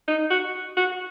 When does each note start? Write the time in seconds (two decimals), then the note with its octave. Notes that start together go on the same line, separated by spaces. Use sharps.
0.08 D#4
0.30 F#4
0.77 F#4